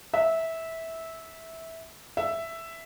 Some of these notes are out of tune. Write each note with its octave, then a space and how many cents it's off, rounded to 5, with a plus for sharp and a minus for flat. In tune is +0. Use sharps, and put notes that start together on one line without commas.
E5 -15
E5 +5